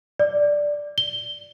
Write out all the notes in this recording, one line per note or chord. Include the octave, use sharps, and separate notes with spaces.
D5
G7